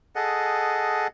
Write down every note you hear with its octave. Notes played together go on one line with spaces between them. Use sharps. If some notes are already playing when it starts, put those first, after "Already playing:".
G#4 A4 D#5 F#5